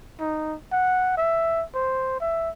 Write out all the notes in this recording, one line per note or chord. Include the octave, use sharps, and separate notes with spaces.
D#4
F#5
E5
C5
E5